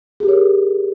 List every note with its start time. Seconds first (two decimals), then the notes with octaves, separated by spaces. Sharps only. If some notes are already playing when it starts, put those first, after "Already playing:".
0.20 G#4
0.23 G4
0.26 A#4
0.28 C#5